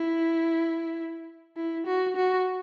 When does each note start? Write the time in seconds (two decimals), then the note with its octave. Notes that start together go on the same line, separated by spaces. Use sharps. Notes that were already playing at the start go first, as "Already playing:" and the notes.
Already playing: E4
1.57 E4
1.86 F#4
2.16 F#4